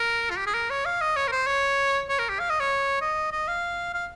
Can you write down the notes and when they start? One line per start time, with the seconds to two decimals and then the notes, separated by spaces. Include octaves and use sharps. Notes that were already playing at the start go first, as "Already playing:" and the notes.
Already playing: A#4
0.30 F4
0.38 G4
0.46 G#4
0.54 A#4
0.70 C#5
0.85 F5
1.01 D#5
1.16 C#5
1.28 A#4
1.31 C5
1.47 C#5
2.09 C#5
2.19 A#4
2.29 G4
2.39 F5
2.50 D#5
2.60 C#5
3.01 D#5
3.32 D#5
3.48 F5
3.94 F5